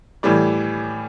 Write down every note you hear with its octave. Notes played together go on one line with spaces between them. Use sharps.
A2 E3 G3 D5